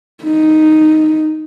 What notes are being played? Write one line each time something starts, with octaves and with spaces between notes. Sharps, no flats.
D#4